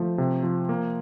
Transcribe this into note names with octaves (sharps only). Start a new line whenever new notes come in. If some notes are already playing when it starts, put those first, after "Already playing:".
Already playing: F3 A3
C3
F3
A#3